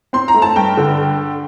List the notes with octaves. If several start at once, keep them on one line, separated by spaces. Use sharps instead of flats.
C4 C6
A#5
A3
A5
G2 G5
D3